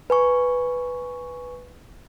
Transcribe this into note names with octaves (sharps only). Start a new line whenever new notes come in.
B4 G#5 C#6